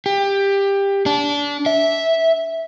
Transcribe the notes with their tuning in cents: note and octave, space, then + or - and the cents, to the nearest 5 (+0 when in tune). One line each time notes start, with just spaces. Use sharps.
G4 +15
D4 -25
E5 -10